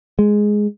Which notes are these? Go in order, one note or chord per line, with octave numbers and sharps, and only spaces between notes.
G#3